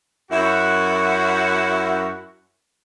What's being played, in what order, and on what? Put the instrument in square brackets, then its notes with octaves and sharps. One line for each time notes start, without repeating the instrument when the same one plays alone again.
[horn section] F#2 E4 F#4